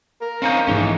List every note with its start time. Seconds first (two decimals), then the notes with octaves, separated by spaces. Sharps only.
0.21 A#4
0.42 C4 C#4 D#4 F5 A#5 G6
0.67 A#1 G#2 E3 G#3 C#4 G7